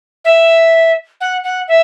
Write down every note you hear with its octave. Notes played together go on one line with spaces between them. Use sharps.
E5
F#5
F#5
E5